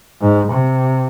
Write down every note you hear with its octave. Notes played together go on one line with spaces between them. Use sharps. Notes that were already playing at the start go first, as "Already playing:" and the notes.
G#2
C3